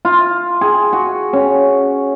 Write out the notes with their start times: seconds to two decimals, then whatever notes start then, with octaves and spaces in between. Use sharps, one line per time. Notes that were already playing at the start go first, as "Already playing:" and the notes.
0.05 F4
0.61 G#4
0.93 F#4
1.33 C#4